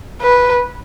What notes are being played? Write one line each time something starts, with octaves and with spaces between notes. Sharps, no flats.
B4